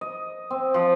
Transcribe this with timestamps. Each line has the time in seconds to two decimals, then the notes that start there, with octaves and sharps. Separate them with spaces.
0.01 D#5
0.50 C4
0.74 F3